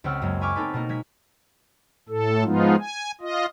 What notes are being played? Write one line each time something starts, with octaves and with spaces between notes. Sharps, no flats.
C#2 C4 B4 F#5 E6 F6
F#2 F#3 G#3 A#3
G#5 B5 C#6 D6 F6 G#6
B3 C4 D#4 A4 B4
B2 A#3 D#4
G#3 G#6 B6
A2 A4
G#2 F3 G#3 B3 D#4 F4
G#5
F4 D#5